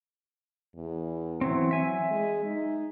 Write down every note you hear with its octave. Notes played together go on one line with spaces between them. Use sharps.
E2
E3 F#3 C4
F#3 E5 G#5
G#3
D#4